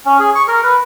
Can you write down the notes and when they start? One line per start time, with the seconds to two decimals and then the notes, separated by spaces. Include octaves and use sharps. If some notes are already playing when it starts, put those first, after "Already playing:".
0.05 C#4
0.19 G#4
0.35 C#6
0.48 A#4
0.63 B4